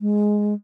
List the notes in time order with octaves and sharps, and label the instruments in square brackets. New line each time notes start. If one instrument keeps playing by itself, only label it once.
[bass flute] G#3